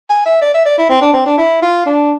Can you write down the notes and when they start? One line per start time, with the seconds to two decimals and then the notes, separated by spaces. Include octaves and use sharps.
0.10 G#5
0.26 E5
0.42 D5
0.54 E5
0.66 D5
0.78 E4
0.90 C4
1.02 D4
1.13 C4
1.26 D4
1.38 E4
1.62 F4
1.86 D4